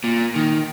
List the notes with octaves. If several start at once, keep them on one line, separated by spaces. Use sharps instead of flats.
A#2
D#3